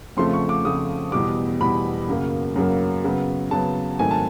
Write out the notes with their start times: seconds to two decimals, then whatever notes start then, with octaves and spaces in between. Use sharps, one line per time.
0.17 F2 C#3 F3 A3 C6
0.33 C#6
0.49 D6
0.64 F2 C#3 F3 A3 D#6
1.12 E2 B2 G3 D6
1.60 E2 B2 G3 B5
2.09 F#2 C#3 F#3 A#3
2.56 F#2 C#3 F#3 A#3
3.04 C#3 F#3 B3
3.51 C#3 F#3 B3 A5
3.99 G#2 D#3 F#3 A3 C4 G#5
4.11 A5